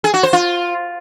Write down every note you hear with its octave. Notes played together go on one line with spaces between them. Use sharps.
G#4
F#4
C5
F4